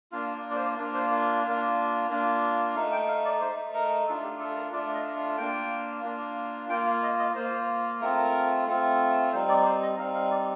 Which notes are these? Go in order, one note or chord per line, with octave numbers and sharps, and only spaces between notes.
A#3 D4 F4 F5
D5
D5
C5
A#3 D4 F4
C5
F5
A#3 D4 F4
A#3 D4 F4
A3 D#4 F5
G5
F5
D5
A3 D#4 C5
A#4
A3 D4 F4 A4
G4
A4
A#4
A3 D4 F4 D5
D#5
F5
A#3 D4 F4 G5
A#3 D4 F4
A#3 F4 G5
F5
D#5
D#5
A#3 F4 C5
A3 C4 F4 A#4
A3 C4 F4
G3 C4 D#4 C5
D5
C5
D#5
G3 C4 D#4 F5
F5
D5